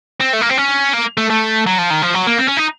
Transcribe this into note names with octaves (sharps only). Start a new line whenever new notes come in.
C4
A3
A#3
C4
C#4
A#3
A3
A3
F#3
F3
D#3
F3
F#3
A#3
C4
C#4
D#4